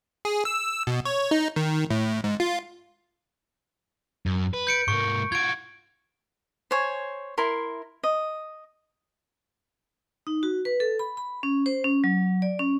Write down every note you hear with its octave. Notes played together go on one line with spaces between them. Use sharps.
G#4
E6
B2
C#5
D#4
D#3
A2
G#2
F4
F#2
B4
G6 C#7 D7
G#2 A#3 C#6
F4 F#4 G#6 D7
C5 C#5 G#5
E4 A#4 C6
D#5
D#4
F#4
B4
A4
B5
B5
C#4
C5
C#4
F#3
D5
C#4